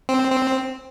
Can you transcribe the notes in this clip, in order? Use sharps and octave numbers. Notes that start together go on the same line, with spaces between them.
C4
C4